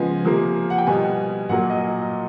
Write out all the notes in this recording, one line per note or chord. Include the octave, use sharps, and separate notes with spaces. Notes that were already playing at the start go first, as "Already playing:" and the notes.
Already playing: C#3 F3 G#3 B3 G#5
C3 F3 A#3
F#5
G5
B2 G3 B3 G#5
A#2 F#3 A#3 F#5
D#5